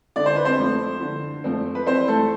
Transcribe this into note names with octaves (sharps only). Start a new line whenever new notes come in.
D3 D5
C5
B4
C4 C5
F3 A3 C4
D3
F3 A3 C4
B4
E3 C4 C5
A3 A4